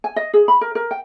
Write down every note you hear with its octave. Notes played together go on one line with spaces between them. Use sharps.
G#5
D#5
G#4
B5
A#4
A#4
G5